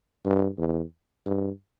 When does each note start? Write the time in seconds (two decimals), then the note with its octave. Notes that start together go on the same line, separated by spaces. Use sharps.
0.25 G2
0.58 E2
1.26 G2